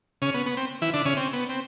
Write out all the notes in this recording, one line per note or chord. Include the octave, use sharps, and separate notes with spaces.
C#3 C#4
B3
B3
C4
E3 E4
D3 D4
C#3 C#4
C4
B3
C4